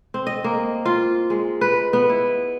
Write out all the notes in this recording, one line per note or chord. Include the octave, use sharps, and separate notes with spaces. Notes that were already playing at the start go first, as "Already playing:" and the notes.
C4
D#5
A#3
F4
G#3
B4
B3
E4